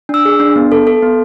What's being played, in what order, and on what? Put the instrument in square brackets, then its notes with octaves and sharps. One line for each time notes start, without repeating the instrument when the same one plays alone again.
[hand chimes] D4 E6
G#4
D4
B3
A4
A4
B3